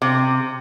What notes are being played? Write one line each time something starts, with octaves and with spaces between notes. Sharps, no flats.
C3